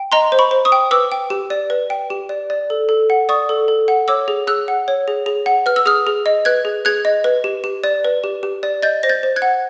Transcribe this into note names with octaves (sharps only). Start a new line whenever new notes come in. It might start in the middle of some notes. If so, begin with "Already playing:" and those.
Already playing: G5
D#5 A#5 C6
C5
B5 C#6
C5
C#6 D#6
G5
B4 D6 E6
G5
G4
D5
B4
G5
G4
D5
D5
A4
A4
F#5
D5 C#6 D#6
A4
A4
F#5
C#5 D6 E6
G#4
G#4 E6 F#6
F#5
C#5
G#4
G#4
F#5
B4 F6
E6
G#4 D#6 F6
G#4
D#5
B4 F#6 G#6
G#4
G#4 F#6 G#6
D#5
B4
G4
G4
D5
B4
G4
G4
D5
D#5 G6 A6
C5 A#6
G6 A6
C5
F#6 G#6
F#5